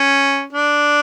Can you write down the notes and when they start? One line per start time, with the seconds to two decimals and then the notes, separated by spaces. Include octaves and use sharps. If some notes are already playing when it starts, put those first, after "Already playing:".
Already playing: C#4
0.53 D4